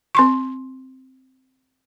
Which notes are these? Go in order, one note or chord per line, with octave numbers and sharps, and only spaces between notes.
C4 C6 C#6